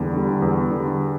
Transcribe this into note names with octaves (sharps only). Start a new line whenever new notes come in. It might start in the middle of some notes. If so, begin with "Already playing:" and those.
Already playing: E2 D3 G3
D3 G3
E2
D3 G3